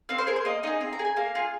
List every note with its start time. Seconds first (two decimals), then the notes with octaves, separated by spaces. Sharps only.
0.09 C4 F5
0.18 C5
0.27 G#4 A#4
0.36 C5
0.45 A#3 D#5
0.63 D#4 G#4 D#5
0.81 C4 F5
0.93 A#5
0.99 G#4
1.05 G#5
1.17 A#3 F5
1.35 F4 G#4